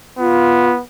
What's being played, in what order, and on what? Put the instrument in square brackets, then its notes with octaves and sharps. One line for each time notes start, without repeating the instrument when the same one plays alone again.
[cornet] B3 [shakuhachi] F4